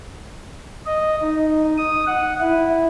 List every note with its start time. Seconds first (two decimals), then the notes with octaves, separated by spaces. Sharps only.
0.86 D#5
1.21 D#4
1.78 D#6
2.07 F#5
2.40 E4